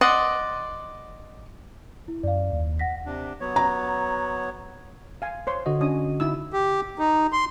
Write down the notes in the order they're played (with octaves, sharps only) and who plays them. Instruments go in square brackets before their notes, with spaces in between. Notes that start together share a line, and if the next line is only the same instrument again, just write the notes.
[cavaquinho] D5 D#5 F#5 C6
[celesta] E4
[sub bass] F#2 [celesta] D5 F5
[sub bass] D#2
[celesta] F#5 A#6 B6
[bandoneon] C3 D4
F#3 B3 C#5
[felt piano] A#5
[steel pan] F5 G#5
C5 C#5 C6
[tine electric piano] D3 F#4 D#5
[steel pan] C#4 D4 D#6
D#4 E4 E6
[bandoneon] G4
D#4
C6